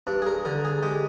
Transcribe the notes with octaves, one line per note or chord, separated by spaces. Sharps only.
G2 D4
G#4
A#4
D3 A#4
G#4
G#3 G4